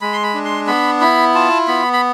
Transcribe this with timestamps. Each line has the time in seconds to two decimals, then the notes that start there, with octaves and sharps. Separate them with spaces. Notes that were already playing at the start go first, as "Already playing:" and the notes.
0.01 G#3 B5
0.13 C6
0.23 B5
0.34 D4
0.45 C6
0.67 B3 B5
1.01 E4 B5
1.34 F4 A5
1.67 B3 B5
1.93 B5